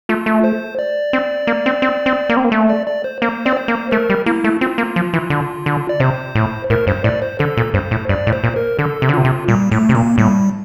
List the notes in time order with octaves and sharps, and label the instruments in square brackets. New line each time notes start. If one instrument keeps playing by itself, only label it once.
[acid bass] A3 [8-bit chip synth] F4
[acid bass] A3
[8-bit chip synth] C5
D5
[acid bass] C4
A#3
C4
C4
C4
A#3
C4
A#3
A3
[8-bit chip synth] D5
D5
C5
[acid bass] A#3 [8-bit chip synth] C5
[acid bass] C4 [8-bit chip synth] D5
[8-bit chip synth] C5
[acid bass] A#3
[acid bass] A3 [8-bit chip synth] A#4
[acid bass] G3
[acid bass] A#3 [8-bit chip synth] E4
[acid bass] A3
[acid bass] C4 [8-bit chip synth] F4
[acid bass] A#3
F3
E3
D3
D3
[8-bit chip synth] D5
[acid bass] C3 [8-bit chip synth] C5
[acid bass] A2
[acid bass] A2 [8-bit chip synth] A#4
[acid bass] G2 [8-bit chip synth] C5
[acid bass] A2 [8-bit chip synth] D5
[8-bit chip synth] C5
[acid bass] D3 [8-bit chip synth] A4
[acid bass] A#2
[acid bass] G2 [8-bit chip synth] C5
[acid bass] A2
[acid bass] G2 [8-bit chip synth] D5
[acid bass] A2
[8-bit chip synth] C5
[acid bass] A#2
[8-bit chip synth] A#4
[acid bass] D3 [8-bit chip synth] A4
[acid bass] C3
D3
[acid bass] C3 [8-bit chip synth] F4
[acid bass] C3
[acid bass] A#2 [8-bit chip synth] G3
[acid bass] A2 [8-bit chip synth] A3
[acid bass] C3
[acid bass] A#2 [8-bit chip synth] A#3
[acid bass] A2 [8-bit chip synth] G3